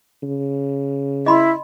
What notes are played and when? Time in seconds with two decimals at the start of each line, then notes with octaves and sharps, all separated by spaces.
0.23 C#3
1.26 E4 D#5 B5 C6